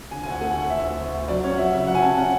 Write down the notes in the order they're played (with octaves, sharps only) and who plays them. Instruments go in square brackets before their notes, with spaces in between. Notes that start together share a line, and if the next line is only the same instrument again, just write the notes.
[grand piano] D3 G#5
D2 G#5
F#5
A3 G#5
F#5
D2
D2 E5
D2
D2
D2
F#3 D5
C#4 C#5
F#5
F#3 E5
C#3 E5
F#3 F#5
G#5
C#4 A5
C#4 F#5